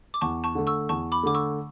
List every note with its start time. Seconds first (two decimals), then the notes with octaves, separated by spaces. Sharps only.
0.14 D6
0.21 E2 A5 C#6
0.44 A5 C#6
0.55 D3 A3
0.67 C#6 E6
0.89 E2 A5 C#6
1.12 B5 D6
1.23 D3 A3 D6
1.35 C#6 E6